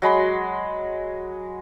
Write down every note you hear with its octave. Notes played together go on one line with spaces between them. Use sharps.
F#3 G#3 B5 C6